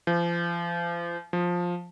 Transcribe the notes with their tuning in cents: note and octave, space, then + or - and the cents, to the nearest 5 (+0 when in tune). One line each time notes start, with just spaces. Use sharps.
F3 -35
F3 +10